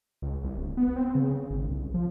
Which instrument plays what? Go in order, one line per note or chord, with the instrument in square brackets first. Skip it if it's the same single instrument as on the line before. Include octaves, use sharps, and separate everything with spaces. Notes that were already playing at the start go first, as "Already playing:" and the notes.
[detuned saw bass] C#2
C2
D1
B3
C4
C#3
G#1
C2
F3